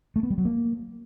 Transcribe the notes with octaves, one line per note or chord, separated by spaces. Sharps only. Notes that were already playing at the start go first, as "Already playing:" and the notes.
A3
B3
G3
F#3
A#3